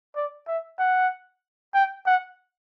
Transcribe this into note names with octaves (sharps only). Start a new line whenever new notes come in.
D5
E5
F#5
G5
F#5